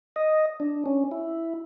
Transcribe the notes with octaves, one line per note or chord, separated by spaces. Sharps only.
D#5
D4
C#4
E4